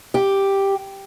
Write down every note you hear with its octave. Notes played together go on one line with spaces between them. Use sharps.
G4